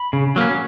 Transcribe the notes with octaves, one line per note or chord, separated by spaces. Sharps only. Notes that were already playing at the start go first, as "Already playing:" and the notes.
Already playing: B5
C#3
F#3 A#3 C#4